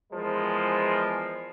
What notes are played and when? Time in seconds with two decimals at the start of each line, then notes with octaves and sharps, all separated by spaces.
0.13 E2 F3 G#3 A#4 B4